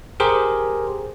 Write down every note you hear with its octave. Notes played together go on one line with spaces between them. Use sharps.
G4 G#4 A#4 C5